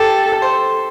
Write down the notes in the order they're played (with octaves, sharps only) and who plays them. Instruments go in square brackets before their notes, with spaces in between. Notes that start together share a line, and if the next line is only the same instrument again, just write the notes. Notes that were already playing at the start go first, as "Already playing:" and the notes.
Already playing: [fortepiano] G4 [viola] A4
[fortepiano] A4
C5